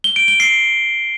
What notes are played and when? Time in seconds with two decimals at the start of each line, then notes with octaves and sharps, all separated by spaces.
0.04 G7
0.16 D7
0.28 G7
0.40 C7